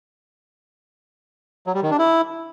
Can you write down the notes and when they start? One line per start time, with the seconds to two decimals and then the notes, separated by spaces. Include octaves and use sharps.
1.67 F#3
1.75 G3
1.83 D#3
1.91 D4
1.99 E4